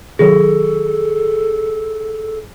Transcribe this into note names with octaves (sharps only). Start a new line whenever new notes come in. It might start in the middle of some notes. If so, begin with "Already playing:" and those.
C3 D#3 F#3 G#4 A4